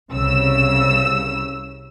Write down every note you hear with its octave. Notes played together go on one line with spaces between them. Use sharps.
C2 C#3 E6